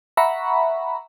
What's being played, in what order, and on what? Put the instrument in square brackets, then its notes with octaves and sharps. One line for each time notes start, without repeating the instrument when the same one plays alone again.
[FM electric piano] E5 F#5 A#5 B5 C#6